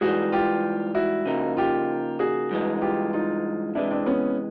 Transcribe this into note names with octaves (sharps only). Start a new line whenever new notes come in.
G#2 E3 G3 F#4 G#4
F4 G4
E4 F#4
C#3 F3 A#3 D#4
F4 G4
F#4 G#4
G2 E3 G#3
F4 G4
D#4 F4
C3 E3 G#3 D4 E4
C4 D4
B3 C#4